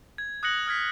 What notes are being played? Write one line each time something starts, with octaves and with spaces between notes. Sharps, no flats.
G#6
D#6 F#6 G#6 A#6 C#7 F#7
D#6 F6 G#6 B6